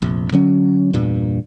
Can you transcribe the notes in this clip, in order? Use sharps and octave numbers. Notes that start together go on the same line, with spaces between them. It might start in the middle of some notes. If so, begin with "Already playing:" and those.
F1 A#1
D3 F#3 C#4
E2 G2 A#2